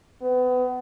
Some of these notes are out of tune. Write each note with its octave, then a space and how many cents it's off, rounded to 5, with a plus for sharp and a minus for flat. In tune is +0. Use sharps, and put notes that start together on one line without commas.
B3 +30